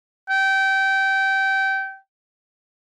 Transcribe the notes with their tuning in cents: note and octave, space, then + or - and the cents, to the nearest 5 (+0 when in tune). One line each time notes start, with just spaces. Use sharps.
G5 -20